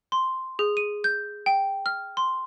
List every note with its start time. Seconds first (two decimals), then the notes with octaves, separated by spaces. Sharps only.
0.12 C6
0.59 G#4
0.77 D#7
1.04 G6
1.46 G5
1.86 F6
2.17 C6